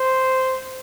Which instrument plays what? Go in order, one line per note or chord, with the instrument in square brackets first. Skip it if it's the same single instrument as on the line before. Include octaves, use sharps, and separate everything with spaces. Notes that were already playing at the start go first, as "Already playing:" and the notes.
Already playing: [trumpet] C5